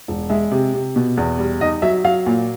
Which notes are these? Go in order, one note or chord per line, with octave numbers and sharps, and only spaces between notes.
E1
G#3 E5
C3
C3
B2
E2
G3
D#4 D#5
F#3 E5
F#3 F5
A#2